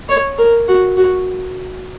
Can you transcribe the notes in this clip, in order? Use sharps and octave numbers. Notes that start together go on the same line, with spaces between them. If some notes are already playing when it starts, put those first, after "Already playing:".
C#5
A#4
F#4
F#4